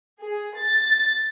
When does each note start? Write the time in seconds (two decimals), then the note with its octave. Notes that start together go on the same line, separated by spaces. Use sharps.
0.20 G#4
0.56 A6